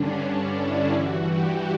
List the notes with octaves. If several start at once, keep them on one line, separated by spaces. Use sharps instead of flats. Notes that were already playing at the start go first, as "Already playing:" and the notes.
Already playing: G2 D3 C#4 D4
D4
E4
G2 E3 F#4
G4